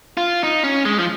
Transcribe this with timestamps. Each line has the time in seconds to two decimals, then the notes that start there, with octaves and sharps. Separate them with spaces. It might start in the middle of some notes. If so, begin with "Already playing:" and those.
0.17 F4
0.43 D#4
0.64 C#4
0.85 G#3
0.99 F3